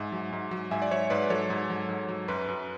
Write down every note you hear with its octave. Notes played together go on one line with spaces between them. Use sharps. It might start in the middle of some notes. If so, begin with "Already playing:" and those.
Already playing: G#2 E5 G#5
F#3
G#2
F#3
G#2 E5 G#5
D5
F#3 C#5 E5
G#2 B4 D5
F#3 A4 C#5
G#2
F#3
G#2
F#3
F#2 B4
F#2